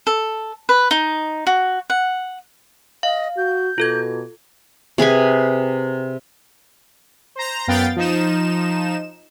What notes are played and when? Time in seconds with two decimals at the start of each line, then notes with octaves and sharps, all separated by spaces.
0.07 A4
0.69 B4
0.91 D#4
1.47 F#4
1.90 F#5
3.03 D#5 F5
3.37 F#4 G6
3.78 B2 F4 A4 G#6
4.98 C3 G#4 B4 G#5
7.36 C5 A#5
7.67 F#2 B3 F5 G5 A6
7.96 F3 D#4 E7